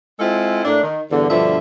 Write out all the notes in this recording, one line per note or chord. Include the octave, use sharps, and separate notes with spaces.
G#3 C4 E4 F4 A4
A2 A#3 D4
D#3
E2 G2 D3
G2 B2 D3 F3 E5